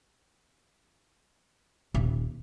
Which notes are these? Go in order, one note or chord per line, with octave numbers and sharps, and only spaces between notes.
D#1